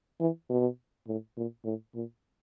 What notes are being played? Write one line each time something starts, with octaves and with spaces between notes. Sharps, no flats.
E3
B2
A2
A#2
A2
A#2